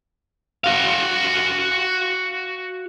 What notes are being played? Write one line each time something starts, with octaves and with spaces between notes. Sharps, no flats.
F#4 F5